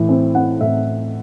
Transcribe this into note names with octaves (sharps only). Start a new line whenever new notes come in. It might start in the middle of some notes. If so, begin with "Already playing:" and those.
Already playing: A2 E3
C4
C4 F#5
A2 E5